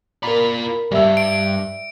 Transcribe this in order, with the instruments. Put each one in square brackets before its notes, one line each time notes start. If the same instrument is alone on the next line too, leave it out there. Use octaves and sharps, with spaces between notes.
[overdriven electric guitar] F4 D5 [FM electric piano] A#4 B5 [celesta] A#5
[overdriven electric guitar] D2 G2 [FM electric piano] G3 [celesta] D5 E5 E6
[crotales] D7